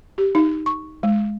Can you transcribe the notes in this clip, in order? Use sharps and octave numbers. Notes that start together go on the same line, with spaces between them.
G4
D#4
C#6
G#3